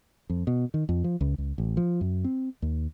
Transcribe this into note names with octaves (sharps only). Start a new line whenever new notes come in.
F2
B2
D#3
F2
F3
C#2
C#2
A1
F3
F#2
C4
D#2